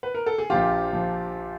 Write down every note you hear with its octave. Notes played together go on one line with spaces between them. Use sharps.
B4
A#4
A4
G#4
A#1 A#2 F3 F4 G4
A#2 F3